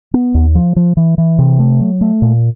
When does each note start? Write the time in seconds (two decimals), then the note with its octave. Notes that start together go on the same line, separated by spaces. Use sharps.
0.14 B3
0.34 D#2
0.55 F3
0.76 F3
0.97 E3
1.18 E3
1.38 C3
1.59 A3
1.80 F#3
2.01 A3
2.22 A#2